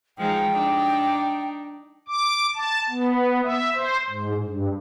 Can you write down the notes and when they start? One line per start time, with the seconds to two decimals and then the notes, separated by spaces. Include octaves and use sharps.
0.18 F3 G#3 D#4 G5
0.52 D4 D#4
2.08 D6
2.55 A5
2.90 B3
3.43 E5
3.74 C5
4.09 G#2
4.45 G2